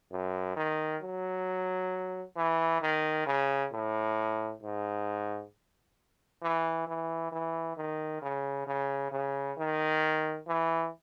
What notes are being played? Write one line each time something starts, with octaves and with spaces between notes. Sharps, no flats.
F#2
D#3
F#3
E3
D#3
C#3
A2
G#2
E3
E3
E3
D#3
C#3
C#3
C#3
D#3
E3